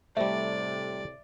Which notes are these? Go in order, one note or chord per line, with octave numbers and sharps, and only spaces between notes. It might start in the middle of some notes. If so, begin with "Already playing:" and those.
A2 C3 G3 A3 D5 E5